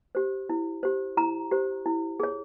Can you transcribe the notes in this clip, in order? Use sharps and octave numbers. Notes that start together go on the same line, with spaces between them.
G4 C5
E4
G4 C5
E4 A#5
G4 C5
E4
G#4 C#5